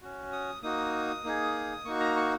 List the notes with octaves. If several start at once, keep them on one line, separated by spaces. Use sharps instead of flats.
C#4 F#4
D#6
A#3 D#4 F#4 D#6
A#3 D#4 G#4
A#3 D#4 F#4 C#6
A#5
C#6